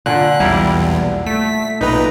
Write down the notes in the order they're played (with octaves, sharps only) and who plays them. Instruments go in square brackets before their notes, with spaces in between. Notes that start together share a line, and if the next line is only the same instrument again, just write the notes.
[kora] A#2 [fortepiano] D3 [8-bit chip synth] F#6
[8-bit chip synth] B1 E2 [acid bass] G3 [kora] E4 A#4
[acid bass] A3 [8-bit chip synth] B6
[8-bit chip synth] B1 A#2 A#5 [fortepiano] D#4 B4 B5